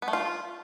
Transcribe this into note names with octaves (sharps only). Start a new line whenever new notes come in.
B3
A3
F4